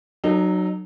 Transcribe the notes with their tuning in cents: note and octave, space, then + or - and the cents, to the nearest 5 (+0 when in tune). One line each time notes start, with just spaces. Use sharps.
F#3 +0 D#4 -40 A4 +10